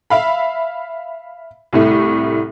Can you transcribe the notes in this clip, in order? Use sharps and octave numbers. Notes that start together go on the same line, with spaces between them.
E5 F5 B5
C2 A2 A3